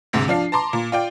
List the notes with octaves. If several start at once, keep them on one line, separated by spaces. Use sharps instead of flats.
D2 G#2 C3 G#3
F3 D4 F5 C7
A5 A#5 C6 D6
A#2
F4 D5 G5